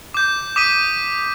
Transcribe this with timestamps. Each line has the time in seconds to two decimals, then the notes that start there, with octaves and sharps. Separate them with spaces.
0.14 D6 G6
0.56 D6 D#6 B6 D#7